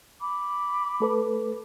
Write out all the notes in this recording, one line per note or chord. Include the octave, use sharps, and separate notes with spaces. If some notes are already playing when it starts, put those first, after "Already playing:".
B5 D6
A3 A4 B4